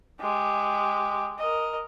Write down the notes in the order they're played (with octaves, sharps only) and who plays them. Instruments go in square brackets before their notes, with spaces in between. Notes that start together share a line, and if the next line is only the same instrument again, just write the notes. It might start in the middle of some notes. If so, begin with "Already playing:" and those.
[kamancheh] G#3 G4
A#4 D#5